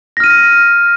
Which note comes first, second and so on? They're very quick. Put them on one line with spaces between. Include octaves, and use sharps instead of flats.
A#6 F6 D#7